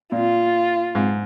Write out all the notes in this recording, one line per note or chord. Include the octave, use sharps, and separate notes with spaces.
A#2 F4
G#2